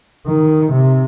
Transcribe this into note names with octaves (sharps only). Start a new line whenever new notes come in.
D#3
C3